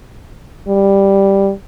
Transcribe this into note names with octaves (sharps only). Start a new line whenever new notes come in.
G3